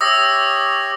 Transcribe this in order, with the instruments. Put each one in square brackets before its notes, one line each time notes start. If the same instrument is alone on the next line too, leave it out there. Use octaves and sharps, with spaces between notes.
[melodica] G4 C#5 E5 [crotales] D#6 E6 A#6